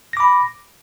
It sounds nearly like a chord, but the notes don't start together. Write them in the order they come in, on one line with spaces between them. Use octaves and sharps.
A#6 D6 B5